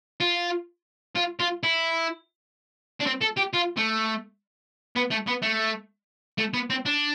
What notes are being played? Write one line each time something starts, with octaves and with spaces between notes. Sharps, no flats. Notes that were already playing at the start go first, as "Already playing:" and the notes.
F4
F4
F4
E4
D4
C4
A4
G4
F4
A3
B3
A3
B3
A3
A3
B3
C4
D4